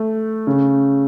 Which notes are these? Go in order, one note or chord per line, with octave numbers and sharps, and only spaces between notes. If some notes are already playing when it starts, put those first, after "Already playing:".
Already playing: A3
C#3